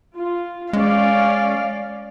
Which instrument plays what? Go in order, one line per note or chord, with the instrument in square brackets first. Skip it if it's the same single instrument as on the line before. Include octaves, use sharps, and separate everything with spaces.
[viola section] F4
[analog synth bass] G#3 [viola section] C#4 D5 [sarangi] F5